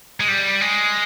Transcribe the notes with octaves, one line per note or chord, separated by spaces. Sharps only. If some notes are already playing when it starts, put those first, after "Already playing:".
G#3
G3
G#3